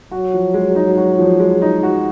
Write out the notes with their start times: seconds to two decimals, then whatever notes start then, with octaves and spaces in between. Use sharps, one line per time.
0.11 F#3 F#4
0.34 F3
0.54 G#3
0.75 D#4
0.97 F#4
1.19 F3
1.40 G#3
1.62 D#4
1.83 F#4